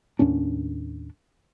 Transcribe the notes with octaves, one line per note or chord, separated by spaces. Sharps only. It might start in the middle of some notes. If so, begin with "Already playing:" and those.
D#2 A2 C#4 D4